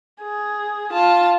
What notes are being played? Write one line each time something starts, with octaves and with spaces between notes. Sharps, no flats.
G#4
F4 A5